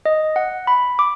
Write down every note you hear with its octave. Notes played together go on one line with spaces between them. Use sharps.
D#5
F#5
B5
D6